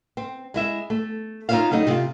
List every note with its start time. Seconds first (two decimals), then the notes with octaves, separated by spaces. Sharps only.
0.17 C4
0.54 G#3 E4 E5
0.90 A3
1.49 D#4 F4 G4 C#5 E5 F5
1.71 F#3 G3 A3 D#4
1.87 C3 F4